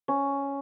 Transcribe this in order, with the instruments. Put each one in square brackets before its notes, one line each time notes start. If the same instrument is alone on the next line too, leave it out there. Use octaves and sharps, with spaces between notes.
[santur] C#4